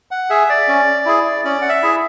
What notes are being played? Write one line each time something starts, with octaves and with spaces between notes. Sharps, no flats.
F#5
G#4 E5
D5
C#4
E4 G#4
C#4 D5
F#5
E5
E4 G#4